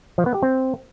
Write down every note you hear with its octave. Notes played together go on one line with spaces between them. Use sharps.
F3
B3
G4
C4